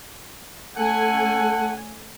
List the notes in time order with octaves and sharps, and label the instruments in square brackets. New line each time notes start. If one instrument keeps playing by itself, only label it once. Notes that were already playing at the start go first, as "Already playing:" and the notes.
[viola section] A3 C#4 G#5 [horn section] A4 F#5